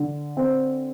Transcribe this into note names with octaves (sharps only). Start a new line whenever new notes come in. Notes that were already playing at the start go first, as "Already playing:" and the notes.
Already playing: D3
C4